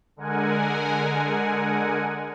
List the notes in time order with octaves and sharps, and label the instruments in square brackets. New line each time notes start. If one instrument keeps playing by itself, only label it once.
[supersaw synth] D3 G#3 A#4 F#5 G#5